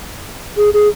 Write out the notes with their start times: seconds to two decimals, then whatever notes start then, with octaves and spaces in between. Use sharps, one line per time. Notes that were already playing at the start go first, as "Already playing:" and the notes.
0.57 G#4
0.74 G#4